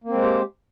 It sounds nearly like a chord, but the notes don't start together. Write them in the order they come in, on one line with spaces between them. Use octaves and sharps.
A#3 C4 G#3 C5 G4